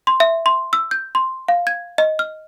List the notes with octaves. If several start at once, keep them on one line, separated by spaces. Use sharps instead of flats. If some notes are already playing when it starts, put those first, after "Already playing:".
C6
E5
C6
E6
G6
C6
F5
G#6
D#5
F6